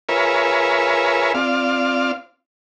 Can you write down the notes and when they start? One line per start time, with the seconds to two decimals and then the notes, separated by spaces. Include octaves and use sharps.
0.09 F4 G#4 A#4 B4 C#5 E5
1.35 C4 F4 D5 F5